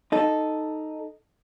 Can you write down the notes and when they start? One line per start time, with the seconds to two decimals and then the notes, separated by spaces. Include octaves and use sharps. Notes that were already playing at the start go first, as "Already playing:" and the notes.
0.12 D#4 A4